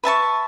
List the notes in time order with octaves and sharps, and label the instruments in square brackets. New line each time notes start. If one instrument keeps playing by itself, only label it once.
[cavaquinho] B4 E5 A5 C#6